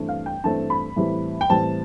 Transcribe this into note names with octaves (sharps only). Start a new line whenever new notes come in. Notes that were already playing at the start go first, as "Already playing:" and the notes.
Already playing: G2 E3 A3 C4
F5
G5
G2 E3 A3 C4 A5
B5
A2 E3 G3 C4
G5
A2 E3 G3 C4 A5